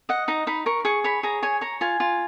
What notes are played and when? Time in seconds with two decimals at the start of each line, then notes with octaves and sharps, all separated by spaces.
0.09 D#5 F#5
0.28 D#4 A#5
0.47 D#4 B5
0.66 A#4 C#6
0.85 G#4 C#6
1.04 C#5 B5
1.23 G#4 A#5
1.43 C#5 G#5
1.61 C#5 A#5
1.81 F4 G#5
2.00 F4